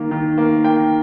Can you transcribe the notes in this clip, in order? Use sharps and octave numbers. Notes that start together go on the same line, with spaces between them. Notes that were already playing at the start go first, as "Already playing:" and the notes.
Already playing: D#3 A#3
D#3
A#3
A#3 G5